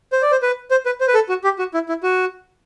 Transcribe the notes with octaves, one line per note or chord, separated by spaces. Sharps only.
C5
D5
C5
B4
C5
B4
C5
B4
A4
F#4
G4
F#4
E4
E4
F#4